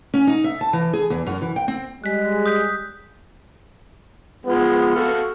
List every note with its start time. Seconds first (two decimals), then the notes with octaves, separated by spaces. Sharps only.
0.14 C#4
0.27 D#4
0.44 E5
0.61 A5
0.73 E3
0.93 G#4
1.10 E2
1.26 F#2
1.42 E3
1.56 G5
1.68 C4
2.04 G3 G#3 F#6 B6
2.46 D#6 G6 B6
4.46 F3 G#3 B3
4.95 F#4 A4 F5